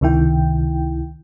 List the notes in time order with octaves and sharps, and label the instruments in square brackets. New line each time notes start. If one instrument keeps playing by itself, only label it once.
[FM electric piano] C#2 C3 D#3 E4 G5